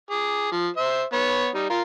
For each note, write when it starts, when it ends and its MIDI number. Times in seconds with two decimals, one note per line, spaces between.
0.10 0.50 68
0.10 0.50 86
0.51 0.67 53
0.77 1.03 72
0.77 1.03 76
1.13 1.47 59
1.13 1.47 73
1.55 1.65 55
1.55 1.65 63
1.70 1.82 65
1.70 1.82 70